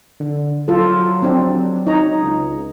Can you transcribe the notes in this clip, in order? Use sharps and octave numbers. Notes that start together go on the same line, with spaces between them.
D3
F#3 F4 A4
C4 D4
D#4 C#5 A#5
C#2